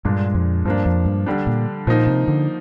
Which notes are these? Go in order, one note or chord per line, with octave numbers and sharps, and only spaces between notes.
G2 A#2 G#3 D4
F2
G2 F3 A#3 D4
F2
G2
D3 G3 D4
A#2
A#2 F3 A#3 D#4
C3
D3